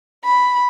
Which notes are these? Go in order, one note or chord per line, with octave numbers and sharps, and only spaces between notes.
B5